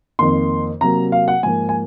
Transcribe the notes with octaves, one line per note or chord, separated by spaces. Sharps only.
F2 D#3 A#3 C6
C3 F#3 A#3 A#5
F5
F#5
G#2 F3 A#3 G#5
G#5